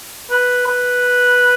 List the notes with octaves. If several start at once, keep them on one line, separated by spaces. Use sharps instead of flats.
B4
B4